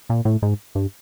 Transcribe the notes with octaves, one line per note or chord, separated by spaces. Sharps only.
A#2
A2
G#2
G2